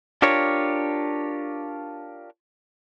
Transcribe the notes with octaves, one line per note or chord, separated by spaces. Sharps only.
D4 F4 G4 A#4 C#5